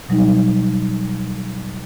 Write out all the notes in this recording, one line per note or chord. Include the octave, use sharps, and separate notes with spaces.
B2 F#3 G3 D#4